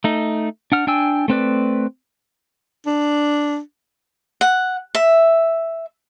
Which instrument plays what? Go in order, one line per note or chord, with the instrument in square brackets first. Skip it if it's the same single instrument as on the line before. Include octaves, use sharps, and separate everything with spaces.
[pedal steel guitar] A3 D#4
D4 F#5 F6
D4 G5 G#5 E6
A3 C4 B4 D5
[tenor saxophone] D4
[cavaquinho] F#5
E5